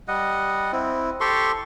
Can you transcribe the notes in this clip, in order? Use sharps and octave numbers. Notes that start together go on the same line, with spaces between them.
G3 D#5 F#5
C4 E4
G4 A4 C6 C#6